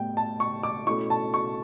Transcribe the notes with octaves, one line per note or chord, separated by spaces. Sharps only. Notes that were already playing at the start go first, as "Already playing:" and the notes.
Already playing: A2 G3 B3 G5
A5
C#6
D6
B2 A3 C#4 E4 C#6
A5
C#6